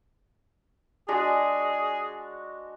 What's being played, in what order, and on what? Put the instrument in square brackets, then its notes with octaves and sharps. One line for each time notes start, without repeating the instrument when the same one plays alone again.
[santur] G#3 D4 F#4 [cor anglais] G#4